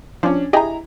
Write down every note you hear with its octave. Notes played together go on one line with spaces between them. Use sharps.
F3 C#4 D4
E4 G4 G#4 D#5 A#5